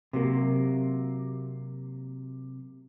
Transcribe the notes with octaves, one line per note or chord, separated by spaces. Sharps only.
C3 F#3 A#3